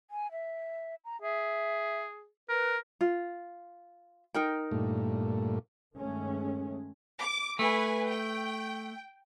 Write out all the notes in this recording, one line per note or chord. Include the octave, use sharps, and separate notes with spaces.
G#5
E5
A#5
G#4 E5
A#4 B4
F4
D#4 A#4 G5
G2 A#2 A3
G2 D#3 G#3 A3 C#4
D6
A3 B4 G#5
G5